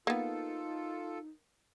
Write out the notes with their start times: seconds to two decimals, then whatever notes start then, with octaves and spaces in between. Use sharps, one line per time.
0.07 A#3 B3 D#4 F4 A4